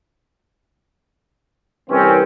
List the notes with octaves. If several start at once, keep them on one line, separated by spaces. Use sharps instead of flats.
C2 E3 C4 C#4